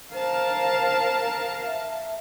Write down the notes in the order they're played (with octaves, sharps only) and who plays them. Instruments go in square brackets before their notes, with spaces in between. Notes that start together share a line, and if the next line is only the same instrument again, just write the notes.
[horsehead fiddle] A#4 F5 [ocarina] C5 [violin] A5
[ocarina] E5